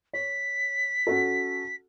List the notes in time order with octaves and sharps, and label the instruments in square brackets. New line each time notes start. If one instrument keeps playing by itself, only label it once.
[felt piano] C#5 [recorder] B6
[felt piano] C#4 F#4 A4